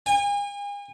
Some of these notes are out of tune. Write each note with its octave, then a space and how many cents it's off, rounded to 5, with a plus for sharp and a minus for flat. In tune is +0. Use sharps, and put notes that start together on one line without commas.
G#5 -40